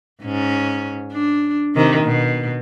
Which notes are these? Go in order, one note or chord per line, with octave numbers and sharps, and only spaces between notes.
G#2 C#4
D4
C3 D#3
B2